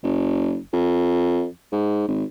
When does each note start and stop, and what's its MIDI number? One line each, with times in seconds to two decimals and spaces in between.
0.03 0.57 30
0.73 1.46 41
1.72 2.06 44
2.08 2.24 32